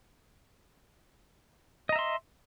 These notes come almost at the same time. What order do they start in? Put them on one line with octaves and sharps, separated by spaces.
D#5 A#5 E5 C6